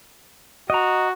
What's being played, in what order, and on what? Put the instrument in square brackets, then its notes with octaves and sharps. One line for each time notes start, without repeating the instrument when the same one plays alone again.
[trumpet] F#4 [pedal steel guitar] D#5 A#5